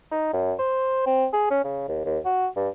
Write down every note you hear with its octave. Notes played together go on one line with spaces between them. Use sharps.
D#4
F#2
C5
C4
G#4
C#4
C#3
D#2
D#2
F#4
G2